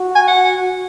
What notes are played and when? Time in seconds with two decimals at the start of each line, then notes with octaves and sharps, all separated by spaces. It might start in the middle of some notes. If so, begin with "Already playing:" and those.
Already playing: F#4
0.15 G#5
0.28 F#5